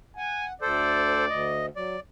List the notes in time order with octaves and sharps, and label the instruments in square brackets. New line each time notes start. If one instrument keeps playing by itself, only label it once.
[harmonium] F#5 [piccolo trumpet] G#5
[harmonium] D2 [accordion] A4 C5 [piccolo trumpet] D5
[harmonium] D2 [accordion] D#5
[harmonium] F#3 [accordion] D5